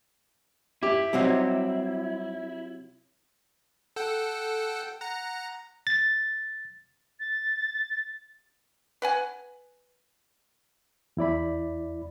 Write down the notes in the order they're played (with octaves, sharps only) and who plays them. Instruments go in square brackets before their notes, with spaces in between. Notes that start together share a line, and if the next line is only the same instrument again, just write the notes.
[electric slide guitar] E4 [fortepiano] G4
[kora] C3 F#3 [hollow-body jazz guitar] G3 C4 D#4
[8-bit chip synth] A4 F#5 G5
F#5 A#5
[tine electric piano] A6
[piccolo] A6
[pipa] B4 F#5 G#5
[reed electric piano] E2 E4 D5 B5